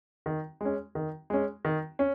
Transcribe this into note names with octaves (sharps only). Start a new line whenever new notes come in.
D#3
G#3 C#4
D#3
G#3 C#4
D#3
C#4